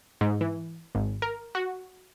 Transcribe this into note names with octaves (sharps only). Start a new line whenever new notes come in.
G#2
E3
G#1
A#4
F#4